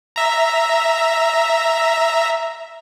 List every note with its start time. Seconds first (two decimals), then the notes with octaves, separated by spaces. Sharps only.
0.16 E5 A#5